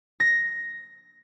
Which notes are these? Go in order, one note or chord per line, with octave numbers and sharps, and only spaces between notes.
A#6